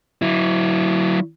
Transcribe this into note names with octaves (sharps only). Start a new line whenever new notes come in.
F#3 E4